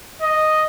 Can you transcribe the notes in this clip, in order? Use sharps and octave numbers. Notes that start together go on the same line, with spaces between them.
D#5